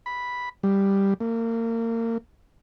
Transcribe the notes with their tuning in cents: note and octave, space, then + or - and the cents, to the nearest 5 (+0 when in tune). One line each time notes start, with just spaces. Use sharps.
B5 -5
G3 +5
A#3 -30